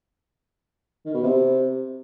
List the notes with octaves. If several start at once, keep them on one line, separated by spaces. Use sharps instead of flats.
D#3
B2
C3